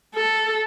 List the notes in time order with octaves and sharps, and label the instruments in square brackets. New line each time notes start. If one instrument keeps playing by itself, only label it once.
[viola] A4